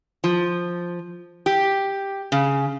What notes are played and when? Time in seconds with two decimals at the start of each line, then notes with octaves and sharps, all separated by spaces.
0.24 F3
1.46 G4
2.32 C#3